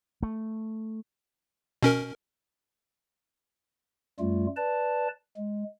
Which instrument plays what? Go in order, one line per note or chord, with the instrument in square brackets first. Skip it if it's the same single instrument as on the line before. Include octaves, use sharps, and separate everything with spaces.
[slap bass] A3
[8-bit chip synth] B2 C#4 A#4
[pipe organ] F#2 G3 A3 F4
B4 D5 A5
G#3